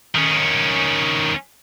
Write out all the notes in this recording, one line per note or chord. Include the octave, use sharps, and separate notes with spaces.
D#3 C#4